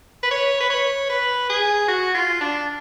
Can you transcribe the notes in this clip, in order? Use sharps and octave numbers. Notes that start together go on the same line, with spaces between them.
B4
C#5
B4
C#5
B4
G#4
F#4
F4
D4